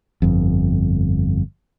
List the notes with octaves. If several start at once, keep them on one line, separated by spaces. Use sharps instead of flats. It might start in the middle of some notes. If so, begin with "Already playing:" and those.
G1 F2